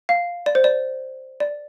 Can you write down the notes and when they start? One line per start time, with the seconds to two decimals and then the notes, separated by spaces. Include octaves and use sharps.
0.09 F5
0.46 D5
0.55 C5
0.64 D5
1.40 D5